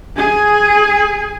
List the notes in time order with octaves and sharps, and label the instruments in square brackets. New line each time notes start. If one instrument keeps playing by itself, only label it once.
[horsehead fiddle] G#4 G#5